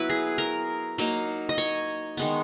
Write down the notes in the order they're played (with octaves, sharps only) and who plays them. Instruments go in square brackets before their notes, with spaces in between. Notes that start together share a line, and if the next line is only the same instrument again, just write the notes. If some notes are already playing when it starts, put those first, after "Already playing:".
Already playing: [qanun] F#3 B3 E4 B4
G#4
A#4
F#3 A#3 D#4
D#5
C#5
D#3 G#3 B3